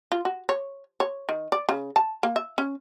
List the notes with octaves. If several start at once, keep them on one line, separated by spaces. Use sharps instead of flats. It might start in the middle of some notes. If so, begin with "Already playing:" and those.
F4
F#4
C#5
C#5
D#3
D5
C#3
A5
A#3
E5
C#4